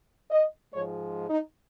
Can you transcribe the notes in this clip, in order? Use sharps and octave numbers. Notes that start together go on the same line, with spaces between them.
D#5
G#2 F3 G#3 C#5
D#4